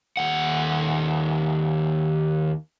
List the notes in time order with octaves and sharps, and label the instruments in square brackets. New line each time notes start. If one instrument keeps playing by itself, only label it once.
[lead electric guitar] D#2 F#5